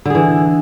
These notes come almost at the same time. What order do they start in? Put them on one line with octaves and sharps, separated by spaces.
D3 G#4 E3